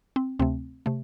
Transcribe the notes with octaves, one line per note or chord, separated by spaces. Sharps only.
C4
D2 C3 A3 C4
C3 A3